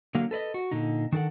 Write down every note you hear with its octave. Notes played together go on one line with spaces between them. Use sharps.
D3 F#3 A#3 F5
A4 B4 D5 D#5
F#4
A#2 D3 D#4
D#3 D4 A4 A#4 F#5